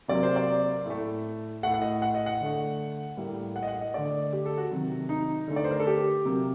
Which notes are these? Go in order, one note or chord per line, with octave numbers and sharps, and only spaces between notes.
C3 F#3 A#3 D5
C5
D5
A2 A3
A2 A3 F#5
F#5
D#5
F#5
D#5
F#5
D3 A3
A2 G3 A#3
F#5
D#5
F#5
D#5
D3 A3 D5
G4
A4
F#4
C3 D#3 F#3
D#4
D3 A3
D5
C5
A#4
A4
G4
C3 F#3 A#3